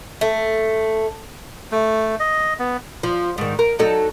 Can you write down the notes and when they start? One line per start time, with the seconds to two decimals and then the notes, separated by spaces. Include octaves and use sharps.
0.21 A3
1.72 A3
2.20 D#5
2.59 B3
3.03 F3
3.38 G#2 D#3
3.59 A#4
3.79 F#3 D#4 A4